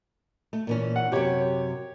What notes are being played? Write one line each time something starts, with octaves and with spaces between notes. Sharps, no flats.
A3
A#2 E3 C#4
F#5
F#2 C3 G4 C#5